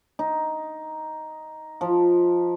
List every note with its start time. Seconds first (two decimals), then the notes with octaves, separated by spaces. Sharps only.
0.19 D#4
1.81 F3